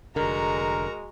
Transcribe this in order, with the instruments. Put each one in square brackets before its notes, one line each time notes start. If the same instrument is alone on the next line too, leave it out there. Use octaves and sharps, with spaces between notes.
[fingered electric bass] F1 D3 [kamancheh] G#3 [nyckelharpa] F#4 A#5 [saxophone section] A#4